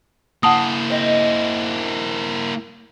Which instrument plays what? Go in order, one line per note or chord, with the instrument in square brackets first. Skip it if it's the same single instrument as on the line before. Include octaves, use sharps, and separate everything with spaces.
[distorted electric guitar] A#3 E4 [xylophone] F#5 A5 D#6
[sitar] C4 D#5